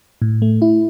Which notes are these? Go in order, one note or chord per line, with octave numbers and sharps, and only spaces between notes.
A2
A3
E4